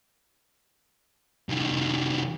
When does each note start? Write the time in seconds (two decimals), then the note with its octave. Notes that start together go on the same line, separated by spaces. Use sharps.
1.49 C2 D#3